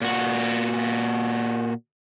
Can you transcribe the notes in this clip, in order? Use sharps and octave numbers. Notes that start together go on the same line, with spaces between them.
A#2 F#4